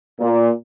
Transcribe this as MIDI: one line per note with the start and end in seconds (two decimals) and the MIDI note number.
0.20 0.50 46